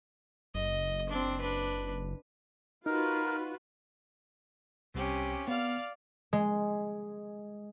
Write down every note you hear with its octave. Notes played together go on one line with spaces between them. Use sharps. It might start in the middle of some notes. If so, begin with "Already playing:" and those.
F#1 D#5
C4 D4
D4 B4
D#4 F4 F#4 A#4 B4
C2 C3 C#4 G4
B3 D5 F5 F6
G#3